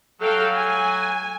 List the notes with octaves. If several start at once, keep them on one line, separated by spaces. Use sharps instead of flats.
F#3 A4 F5 G5
G#5